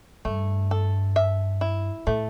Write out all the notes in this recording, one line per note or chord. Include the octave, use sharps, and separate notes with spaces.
G2 A3
A4
E5
E4
A2 A3